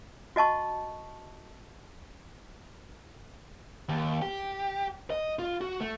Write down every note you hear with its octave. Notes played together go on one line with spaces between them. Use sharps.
F#4 D#5 A5 C#6
D#2
G4
D#5
F4
F#4
A3